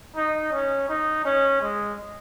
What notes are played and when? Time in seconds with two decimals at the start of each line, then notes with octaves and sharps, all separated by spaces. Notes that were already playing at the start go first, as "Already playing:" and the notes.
0.16 D#4
0.52 C#4
0.89 D#4
1.25 C#4
1.61 G#3